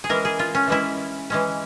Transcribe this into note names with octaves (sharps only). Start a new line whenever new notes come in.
G#4
E3 G#3 C#4 A#4
G#4
F4
C#4
E3 G#3 C#4 E4
E3 G#3 C#4